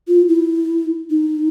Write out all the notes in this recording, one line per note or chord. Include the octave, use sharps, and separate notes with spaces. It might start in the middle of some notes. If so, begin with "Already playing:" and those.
F4
E4
D#4